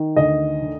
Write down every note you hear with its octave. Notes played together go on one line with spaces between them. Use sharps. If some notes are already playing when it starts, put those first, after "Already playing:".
Already playing: D#3
D2 D#5
D3